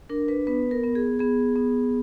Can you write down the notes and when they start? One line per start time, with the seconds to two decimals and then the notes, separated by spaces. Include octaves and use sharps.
0.09 D4 A#4
0.28 B4
0.47 B3 B4
0.71 A#4
0.84 B3
0.95 G#4
1.19 B3 G#4
1.56 B3